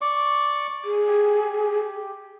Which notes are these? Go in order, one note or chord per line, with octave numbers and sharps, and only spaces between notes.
D5 C#6 D6
G#4
G4